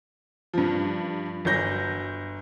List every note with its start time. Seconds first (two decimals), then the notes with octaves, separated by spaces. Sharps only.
0.53 G2 F3
1.45 G1 F#3 G6 A#6